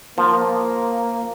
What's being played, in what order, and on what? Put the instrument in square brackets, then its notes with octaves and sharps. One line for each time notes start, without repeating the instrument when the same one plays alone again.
[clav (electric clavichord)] F3 [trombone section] A#3